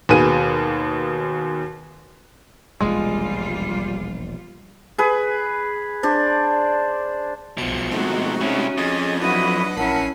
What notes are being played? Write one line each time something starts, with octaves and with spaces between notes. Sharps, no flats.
D#2 B2 G#4 B4 D#7
E1 A#1 D#2 G3 G#3 F4
G#4 B4
D4 C5 D5
B1 B2 F3 C#7
G#3 A3 C4 D#4 F#4
C3 C#4 E4
F2 G#4 D#5
F#3 D4 E4 F#4 B4 D#5 F#5 B5
A#1 C#4 E4 A#4 F#5 A5 B5 C7